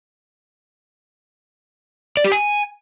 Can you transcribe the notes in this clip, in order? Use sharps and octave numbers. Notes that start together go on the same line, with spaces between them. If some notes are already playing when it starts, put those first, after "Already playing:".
D5
G4
G#5